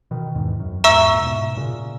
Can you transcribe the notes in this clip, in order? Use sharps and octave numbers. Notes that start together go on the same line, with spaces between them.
B2 D#3
E2 G#2
F#2
E2 G#2 E5 A#5 C#6 E6
A#2
G#2 B2
A#2 C#3